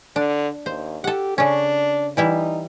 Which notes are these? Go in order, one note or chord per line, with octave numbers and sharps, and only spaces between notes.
D3 D4
D#2 C5
G4 A4 F#5
C#3 C#4 D4
E3 G3 D#4 E4